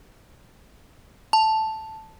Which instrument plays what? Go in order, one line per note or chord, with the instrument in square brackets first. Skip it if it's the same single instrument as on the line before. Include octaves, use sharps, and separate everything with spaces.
[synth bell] A5